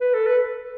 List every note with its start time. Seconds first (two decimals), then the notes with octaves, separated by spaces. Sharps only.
0.01 B4
0.14 A4
0.27 B4